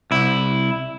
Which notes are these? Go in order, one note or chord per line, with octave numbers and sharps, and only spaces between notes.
C2 E4